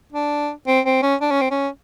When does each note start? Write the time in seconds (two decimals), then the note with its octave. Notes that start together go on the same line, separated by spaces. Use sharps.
0.13 D4
0.67 C4
0.85 C4
1.03 C#4
1.21 D4
1.31 C#4
1.41 C4
1.51 C#4